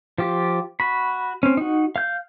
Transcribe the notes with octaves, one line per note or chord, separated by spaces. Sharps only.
F3 F4 G4
F#4 B5
C4 C#4
D#4 F#4
F5 G6